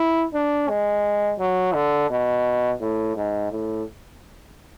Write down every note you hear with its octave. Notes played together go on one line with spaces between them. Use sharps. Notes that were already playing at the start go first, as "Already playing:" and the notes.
Already playing: E4
D4
G#3
F#3
D3
B2
A2
G#2
A2